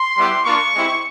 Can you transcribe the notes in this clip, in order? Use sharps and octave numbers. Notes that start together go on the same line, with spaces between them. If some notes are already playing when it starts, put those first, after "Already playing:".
Already playing: C6
G3 B3 E4 G4
A#3 D4 F4 C#6
G#3 C4 E4 G4